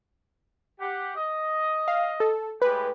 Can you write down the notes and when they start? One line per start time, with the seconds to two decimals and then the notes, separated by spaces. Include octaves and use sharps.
0.81 G4 F#5
1.17 D#5
1.88 F5
2.20 A4
2.62 A2 G#3 G4 B4